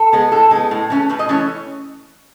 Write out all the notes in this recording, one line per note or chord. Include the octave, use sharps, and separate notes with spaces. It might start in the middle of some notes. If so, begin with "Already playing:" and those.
Already playing: A4
G#3 B3
A2 A4
G#3 B3
A2
E3 A3 C#4
A2 B4
D#5
E3 A3 C#4 C#5